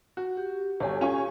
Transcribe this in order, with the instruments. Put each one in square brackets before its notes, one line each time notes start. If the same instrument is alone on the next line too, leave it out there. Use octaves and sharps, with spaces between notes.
[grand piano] F#4
[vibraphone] G4
[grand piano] G1 [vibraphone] F#4 G4 A4 [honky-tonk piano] C#5 G#5
[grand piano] C#4 [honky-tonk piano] F4 G#5 C#6